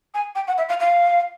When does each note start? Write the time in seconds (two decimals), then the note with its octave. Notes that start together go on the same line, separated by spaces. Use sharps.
0.14 G#5
0.35 G5
0.48 F#5
0.58 E5
0.69 F5
0.80 F5